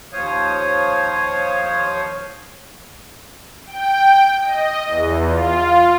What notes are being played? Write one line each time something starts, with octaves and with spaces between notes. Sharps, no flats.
D#2 F3 C5 C#5 F5 D#6
G5
D#5
E2
F4